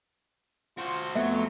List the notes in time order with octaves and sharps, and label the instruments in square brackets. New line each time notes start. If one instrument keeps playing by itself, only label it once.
[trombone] F4 [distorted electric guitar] F#4 C5
[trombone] F2 [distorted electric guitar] F#3 [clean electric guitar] A3 B3 [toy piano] E5